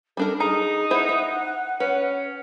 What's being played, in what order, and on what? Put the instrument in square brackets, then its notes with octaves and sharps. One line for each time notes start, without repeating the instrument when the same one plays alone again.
[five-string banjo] G3 D4 A#4 [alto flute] A4
[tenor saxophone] D#4 [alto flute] G#4 [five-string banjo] A#5
[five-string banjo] E4 C5 E5 [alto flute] F#5
[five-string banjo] E5
[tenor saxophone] C#4 [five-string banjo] B4